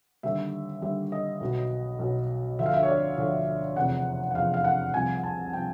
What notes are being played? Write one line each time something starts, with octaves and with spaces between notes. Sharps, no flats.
D#2 D3 G3 E5
D#2 D3 G3 E5
D#5
B1 B2 F#3
B1 B2 F#3
D2 D3 F3 E5
F5
E5
C#5
D5
D2 D3 F3 C#5
F1 E2 C3 F3 F#5
F#5
F1 E2 C3 F3 F5
F5
F#5
C2 C3 F3 G#5
A5
C3 F3 G5